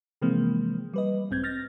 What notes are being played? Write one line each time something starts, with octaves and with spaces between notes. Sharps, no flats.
C3 E3 F3 G#3 A#3 C4
G3 B4 D#5
B1 G#2 C4 G6 G#6
F6 A6 A#6